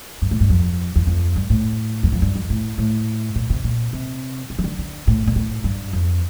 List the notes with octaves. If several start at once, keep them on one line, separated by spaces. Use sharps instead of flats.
G2
A2
G2
F2
E2
F2
G2
A2
E2
F2
G2
F2
A2
A2
A#2
C3
A#2
C3
C3
E3
D3
D3
A2
A#2
A2
G2
F2